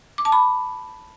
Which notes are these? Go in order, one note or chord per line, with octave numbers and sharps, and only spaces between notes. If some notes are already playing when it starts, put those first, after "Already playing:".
D6
A5
B5